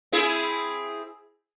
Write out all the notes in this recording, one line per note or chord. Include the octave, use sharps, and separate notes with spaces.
C4 E4 G#4